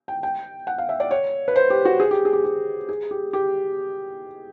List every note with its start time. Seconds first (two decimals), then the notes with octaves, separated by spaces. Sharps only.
0.08 G5
0.23 G5
0.67 F#5
0.78 F5
0.89 E5
1.00 D5
1.11 C#5
1.48 B4
1.56 C5
1.70 G4
1.85 F#4
2.00 G#4
2.11 G4
2.25 G#4
2.33 G4
2.44 G4
2.89 G#4
3.11 G4
3.33 G4